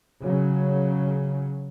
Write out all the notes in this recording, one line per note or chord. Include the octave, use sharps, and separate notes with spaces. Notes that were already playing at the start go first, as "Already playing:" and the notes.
C#3 F#3